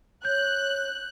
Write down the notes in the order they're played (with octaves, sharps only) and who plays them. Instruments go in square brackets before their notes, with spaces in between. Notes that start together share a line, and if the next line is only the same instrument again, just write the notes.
[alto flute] C#5 [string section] F#6 [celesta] G6